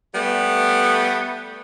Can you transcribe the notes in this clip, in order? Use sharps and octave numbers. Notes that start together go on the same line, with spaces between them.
G3 A3 B3